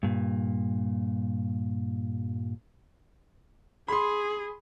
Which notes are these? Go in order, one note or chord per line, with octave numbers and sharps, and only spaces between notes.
G2 A#2
G#4 B5 C6